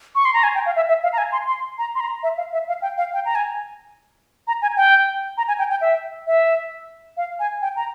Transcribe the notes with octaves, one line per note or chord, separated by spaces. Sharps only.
C#6
C6
A#5
G#5
G5
F5
E5
E5
F5
A#5
G#5
C6
C6
A#5
C6
A#5
E5
F5
E5
F5
G5
F5
G5
A#5
G#5
A#5
G#5
G5
A#5
G#5
G5
G5
E5
E5
F5
G#5
G5
A#5